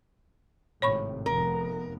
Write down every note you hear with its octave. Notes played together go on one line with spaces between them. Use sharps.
G#1 A2 C3 C#5 B5 C#6
F1 B3 A#4